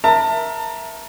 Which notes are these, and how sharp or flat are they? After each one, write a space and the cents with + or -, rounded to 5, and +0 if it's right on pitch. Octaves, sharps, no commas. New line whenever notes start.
A#4 +20 E5 +0 A5 +30